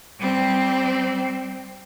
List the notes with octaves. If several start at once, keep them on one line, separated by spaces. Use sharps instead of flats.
G3 C4